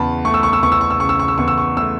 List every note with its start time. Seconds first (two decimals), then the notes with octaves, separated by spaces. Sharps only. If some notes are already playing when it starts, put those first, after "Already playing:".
Already playing: E2 C#3 A5 B5
0.25 A3 C#6
0.34 E6
0.43 C#6
0.53 E6
0.63 E2 C#6
0.72 E6
0.81 C#6
0.91 E6
1.00 C#3 C#6
1.09 E6
1.19 C#6
1.28 E6
1.38 E2 C#6
1.48 E6
1.58 C#6
1.77 A3 E6